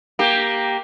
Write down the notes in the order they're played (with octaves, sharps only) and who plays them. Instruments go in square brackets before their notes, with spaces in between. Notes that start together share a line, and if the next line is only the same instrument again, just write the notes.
[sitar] A#3 G4